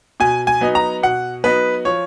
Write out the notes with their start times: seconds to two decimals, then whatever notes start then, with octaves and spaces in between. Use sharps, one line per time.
0.20 B2 G#5
0.47 G#5
0.61 F#3 B3 D#4
0.75 A#5
1.03 B2 F#5
1.44 F#3 B3 D#4 B4
1.85 F3 C#5